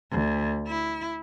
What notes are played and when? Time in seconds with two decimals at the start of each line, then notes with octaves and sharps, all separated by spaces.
0.12 D2
0.67 E4